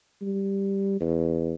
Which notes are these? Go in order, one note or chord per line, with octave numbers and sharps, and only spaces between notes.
G3
E2